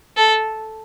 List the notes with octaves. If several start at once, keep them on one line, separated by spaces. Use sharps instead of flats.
A4